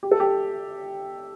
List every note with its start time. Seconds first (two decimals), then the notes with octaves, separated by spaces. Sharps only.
0.03 G4
0.11 A4
0.20 G4